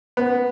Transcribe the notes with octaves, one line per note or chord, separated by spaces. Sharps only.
B3